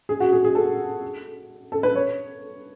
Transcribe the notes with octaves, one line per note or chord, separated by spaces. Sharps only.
G#4
F#4
G#4
G#4
A4
A4
B4
C#5